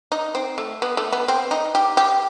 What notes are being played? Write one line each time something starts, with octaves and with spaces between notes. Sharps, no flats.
D#4
C4
A3
B3
A3
B3
C4
D#4
G4
G4